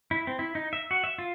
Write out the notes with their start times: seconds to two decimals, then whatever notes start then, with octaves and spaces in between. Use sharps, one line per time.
0.11 E4
0.27 C4
0.39 E4
0.55 D#4
0.73 E5
0.91 F#4
1.04 E5
1.19 F4